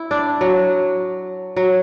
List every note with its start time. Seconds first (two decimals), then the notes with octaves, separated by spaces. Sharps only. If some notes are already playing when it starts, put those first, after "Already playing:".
Already playing: E4
0.11 D4
0.41 F#3
1.57 F#3